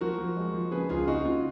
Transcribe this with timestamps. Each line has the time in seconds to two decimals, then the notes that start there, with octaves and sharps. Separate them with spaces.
0.01 F3 F#4 A#4
0.18 F3
0.37 G#3
0.54 F3
0.71 C#3 G#4 B4
0.89 C#2 F4 G#4
1.07 C#3 D#4 F#4
1.25 C#3 F4